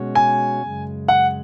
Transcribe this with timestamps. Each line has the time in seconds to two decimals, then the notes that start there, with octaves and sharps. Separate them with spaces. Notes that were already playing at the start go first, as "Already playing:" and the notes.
Already playing: B2 G#3 C#4 F#4 C#5
0.15 G#5
0.61 F#2 C#3 G#3
1.08 F#5